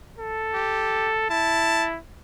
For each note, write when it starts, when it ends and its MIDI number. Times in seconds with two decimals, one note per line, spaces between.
0.18 1.26 69
0.54 1.12 67
1.30 1.98 64
1.30 1.86 81